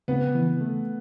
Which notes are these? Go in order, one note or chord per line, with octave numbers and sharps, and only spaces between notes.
C#3 B3
E3
A3